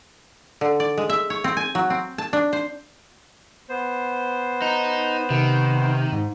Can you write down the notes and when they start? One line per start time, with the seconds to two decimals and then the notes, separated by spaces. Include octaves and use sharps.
0.61 D3
0.80 D5
0.98 G#3
1.09 E5
1.30 C#5
1.44 C4
1.57 G#5
1.75 F#3
1.90 C4
2.18 A5
2.33 D4
2.53 C5
3.69 B3 C5
4.62 D#4
5.30 C3 D#3
6.12 G#2